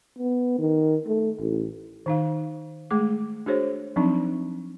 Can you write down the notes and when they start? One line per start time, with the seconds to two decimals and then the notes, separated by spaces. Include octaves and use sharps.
0.19 B3
0.58 D#3
1.08 A3
1.40 A1
2.06 D#3 D#4 F5
2.91 G#3 A3 G#4 D6
3.46 D4 F#4 G#4 C5 C#5
3.96 F3 F#3 C4 D4 D#4